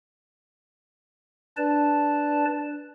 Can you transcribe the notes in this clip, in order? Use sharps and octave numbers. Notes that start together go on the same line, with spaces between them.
D4 B4 D5 A5